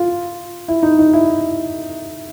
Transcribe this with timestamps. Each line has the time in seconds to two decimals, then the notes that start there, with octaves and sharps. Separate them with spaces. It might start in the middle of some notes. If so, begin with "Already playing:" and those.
Already playing: F4
0.68 E4
0.83 D#4
0.99 D#4
1.13 E4